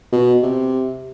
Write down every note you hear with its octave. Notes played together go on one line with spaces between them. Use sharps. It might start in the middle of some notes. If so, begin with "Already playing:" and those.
B2
C3